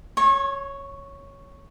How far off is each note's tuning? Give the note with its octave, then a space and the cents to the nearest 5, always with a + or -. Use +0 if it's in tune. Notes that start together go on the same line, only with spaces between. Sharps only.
C#5 +0 C#6 -35